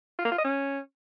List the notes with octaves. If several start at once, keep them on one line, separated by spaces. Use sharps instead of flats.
F4
A#3
F4
D#5
C#4